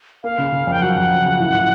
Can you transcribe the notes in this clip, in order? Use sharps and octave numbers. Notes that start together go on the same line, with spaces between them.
A#3 F5
C#3
C#3
F2 G5
F#3 F#5
F2
F2
C#3
A2
A2